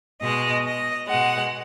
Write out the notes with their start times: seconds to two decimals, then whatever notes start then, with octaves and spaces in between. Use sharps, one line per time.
0.21 B2 G#3 D#5
0.65 D#5
1.09 B2 G#3 F#5